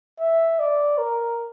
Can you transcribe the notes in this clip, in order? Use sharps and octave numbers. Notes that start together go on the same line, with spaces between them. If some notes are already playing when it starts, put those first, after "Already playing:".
E5
D5
A#4